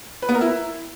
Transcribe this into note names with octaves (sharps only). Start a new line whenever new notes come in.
B4
B3
A#4
E4